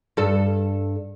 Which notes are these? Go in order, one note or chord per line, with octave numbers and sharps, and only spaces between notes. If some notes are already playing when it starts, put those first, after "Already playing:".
G2 A4